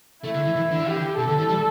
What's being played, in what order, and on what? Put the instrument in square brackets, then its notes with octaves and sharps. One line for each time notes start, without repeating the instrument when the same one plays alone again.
[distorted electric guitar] A3 [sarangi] E4
[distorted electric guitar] D3
E3
E3
D3
[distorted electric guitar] E3 [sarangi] G4
[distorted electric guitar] D3
[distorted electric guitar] B2 [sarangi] A4
[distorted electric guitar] D3
E3
G3